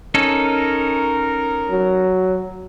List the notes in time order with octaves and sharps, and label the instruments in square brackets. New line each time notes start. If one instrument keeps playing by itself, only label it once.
[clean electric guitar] C#4 D#4 A4 [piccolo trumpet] A#4
[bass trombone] F#3